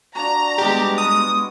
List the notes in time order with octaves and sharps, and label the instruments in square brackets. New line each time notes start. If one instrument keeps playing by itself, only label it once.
[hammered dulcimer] D4 F#4 [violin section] A#5
[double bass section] G3 G#3 B3 [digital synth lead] G4
[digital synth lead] D#6